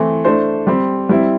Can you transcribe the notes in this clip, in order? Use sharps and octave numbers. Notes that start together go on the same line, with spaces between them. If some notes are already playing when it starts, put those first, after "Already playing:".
Already playing: E3 A3 C4
A3 D4 C5
G3 C4 G4
G3 C4 E4